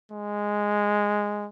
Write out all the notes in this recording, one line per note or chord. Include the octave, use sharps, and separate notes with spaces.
G#3